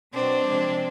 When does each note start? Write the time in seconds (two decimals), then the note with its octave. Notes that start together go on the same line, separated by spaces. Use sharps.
0.13 B2 F#3 C4 D4
0.45 C3 F3 G#3